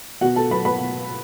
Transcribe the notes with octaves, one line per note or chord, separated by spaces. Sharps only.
B2 F#4 F#5
A4 A5
F#3 B4 B5
B4 B5
B2